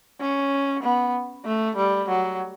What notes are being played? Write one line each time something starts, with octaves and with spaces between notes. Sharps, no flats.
C#4
B3
A3
G3
F#3